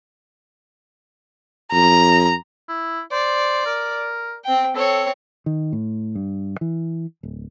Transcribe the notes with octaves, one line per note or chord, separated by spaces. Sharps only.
F2 A#5
E4
C5 D5
A#4
C4 G5
C4 A4 C#5
D#3
A2
G2
E3
D1